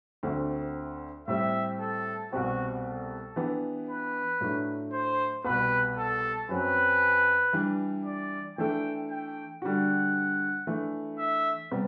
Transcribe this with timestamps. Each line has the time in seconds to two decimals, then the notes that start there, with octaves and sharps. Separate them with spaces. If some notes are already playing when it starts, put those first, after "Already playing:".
0.23 D2 D3 A3 C4
1.28 A2 G3 C4 G4 E5
1.80 A4
2.32 C2 B2 G3 C4 F#4 G4
2.84 A4
3.36 E3 B3 D4 G4
3.89 B4
4.41 A2 F#3 A3 D4
4.93 C5
5.44 C2 B2 G3 B3 B4
5.98 A4
6.49 F#2 F#3 C4 B4
7.53 E3 G3 D4
8.06 D5
8.58 E3 A3 D4 A4 G5
9.10 G5
9.62 D3 G3 D4 F#4 F#5
10.67 E3 A3 D4
11.19 E5
11.71 C3 G3 B3